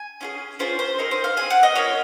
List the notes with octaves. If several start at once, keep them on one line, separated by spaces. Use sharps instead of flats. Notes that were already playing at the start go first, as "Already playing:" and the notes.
Already playing: G#5
C#4 F4 G#4
C#4 F4 G#4 C5
C5
C4 D#4 G#4 A#4
C5
F5
C4 D#4 G#4 G#5
F#5
D#5
A#3 C#4 F4 C#5